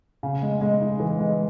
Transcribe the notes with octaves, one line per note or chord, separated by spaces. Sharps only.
C#3
G#3
G#3
D#4
E3
G#3